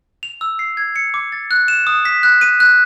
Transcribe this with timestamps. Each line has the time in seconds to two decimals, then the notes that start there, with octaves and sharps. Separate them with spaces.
0.23 F7
0.41 E6
0.59 C7
0.77 G#6
0.96 C#7
1.14 D6
1.32 A6
1.51 F#6
1.68 E7
1.87 D#6
2.05 B6
2.23 F#6
2.41 D#7
2.60 F#6